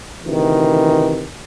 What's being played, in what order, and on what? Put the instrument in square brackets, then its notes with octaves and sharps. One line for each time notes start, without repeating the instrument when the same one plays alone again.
[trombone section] D2 C3 D#3 E3